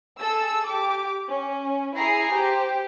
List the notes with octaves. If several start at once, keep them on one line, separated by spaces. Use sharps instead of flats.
G#4 A4 E6
G4 D6
C#4
E4 G#4 G#5 A#5 C7
G4 C5